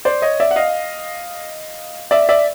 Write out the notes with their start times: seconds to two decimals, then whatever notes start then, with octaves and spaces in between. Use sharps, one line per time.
0.05 C5 D5
0.22 C#5 D#5
0.40 D5 E5
0.51 F#5
0.56 D#5 F5
2.11 D5 E5
2.29 D5 E5